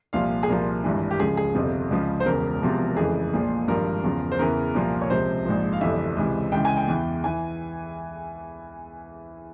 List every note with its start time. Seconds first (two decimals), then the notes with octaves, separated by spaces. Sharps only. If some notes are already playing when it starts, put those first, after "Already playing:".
0.13 C2 A#2 F3 F5
0.43 G#4
0.49 C2 A#2 F3 A#4
0.84 G#1 G2 E3
1.11 G4
1.19 C#2 C#3 F3 G#4
1.37 G#4
1.55 G1 F2 C3 F3
1.91 C#2 C#3 F3
2.20 C5
2.26 E1 E2 C#3 A#4
2.61 E1 E2 C3 F3
2.97 F1 F2 C#3 E3 G#4
3.33 A#1 A#2 F3
3.68 G#1 G2 F3 A#4
4.04 E2 C#3 F3
4.32 C5
4.39 E2 C#3 E3 A#4
4.74 C2 A#2 F3
5.01 C#5
5.10 C#2 C3 F3 C5
5.45 A#1 G#2 F3
5.73 F5
5.81 G1 F2 C3 E3 E5
6.17 C#2 C3 E3
6.52 C#2 C#3 E3 G5
6.65 G#5
6.77 G5
6.88 E2 E3
7.24 E3 G#5